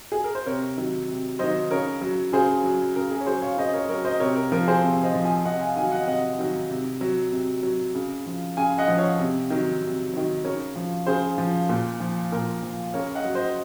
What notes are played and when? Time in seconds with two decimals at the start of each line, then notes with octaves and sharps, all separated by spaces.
0.12 G#4
0.24 A#4
0.35 C5
0.46 C3 A#4 C#5
0.77 D#3 F#3
1.08 C3
1.39 D#3 F#3 C5 D#5
1.71 C#3 A#4 C#5
2.01 F#3
2.33 C#3 G#4 C5
2.64 F#3
2.95 C#3 A#4
3.11 G#4
3.21 C#5
3.27 F#3 G#4 C5
3.42 C#5 F5
3.57 C#3 C5 D#5
3.74 A#4 C#5
3.89 F#3 A#4 C#5
4.05 C5 D#5
4.20 C3 A#4 C#5
4.36 A#4
4.52 F3 A#4
4.67 G#4 C5
4.83 C3
4.93 F5
5.03 C5 D#5
5.14 F3
5.24 F5 G#5
5.45 C3 D#5 F#5
5.60 F5 G#5
5.76 D#3 F#3 F5 G#5
5.92 D#5 F#5
6.07 C3 D#5 F#5
6.39 D#3 F#3
6.69 C3
7.01 F#3
7.32 C3
7.63 F#3
7.95 C#3
8.26 F3
8.57 C#3 F5 G#5
8.78 D#5 F#5
8.88 F3
8.98 C#5 F5
9.19 C3
9.50 D#3 F#3
9.82 C3
10.14 D#3 F#3
10.44 C#3 A#4 C#5
10.76 F3
11.06 C#3 G#4 C5
11.38 F3
11.69 A#2
12.00 F3
12.32 A#2 A#4
12.63 F3
12.94 C#3 A#4 C#5
13.15 D#5 F#5
13.25 F#3
13.35 C5 D#5